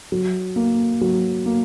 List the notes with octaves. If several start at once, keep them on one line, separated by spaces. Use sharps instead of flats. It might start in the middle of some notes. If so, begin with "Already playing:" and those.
F#3
A#3
F#3
A#3